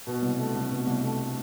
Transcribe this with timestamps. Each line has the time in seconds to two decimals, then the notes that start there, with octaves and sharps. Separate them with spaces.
0.07 B2
0.22 C2
0.39 A3
0.55 C2
0.71 B2
0.87 C2
1.03 A3